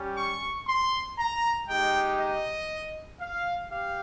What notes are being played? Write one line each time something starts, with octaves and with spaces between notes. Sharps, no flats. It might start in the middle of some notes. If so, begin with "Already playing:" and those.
Already playing: G3 C#4 G4
C#6
C6
A#5
G#3 D#4 G4 G5
D#5
F5
G4 F5